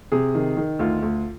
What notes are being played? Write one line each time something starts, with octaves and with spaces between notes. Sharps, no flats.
C3 G#4
D#3
D#3
D2 F4
D2